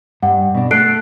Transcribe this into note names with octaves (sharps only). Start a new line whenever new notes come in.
G2 F#5
B2 D4
A3 A4 F#6 C7 D7